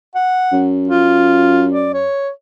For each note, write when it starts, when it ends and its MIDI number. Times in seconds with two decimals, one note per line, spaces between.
0.15 0.66 78
0.52 2.08 42
0.88 1.66 65
1.72 1.91 74
1.93 2.30 73